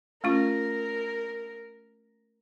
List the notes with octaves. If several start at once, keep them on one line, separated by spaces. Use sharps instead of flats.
A3 C#4 F4 A#4